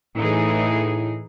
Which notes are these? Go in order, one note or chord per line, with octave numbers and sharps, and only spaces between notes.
A2 E3 D#4 G#4